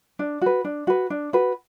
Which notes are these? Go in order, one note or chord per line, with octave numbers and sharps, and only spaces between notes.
D4
F#4 B4
D4
F#4 B4
D4
F#4 B4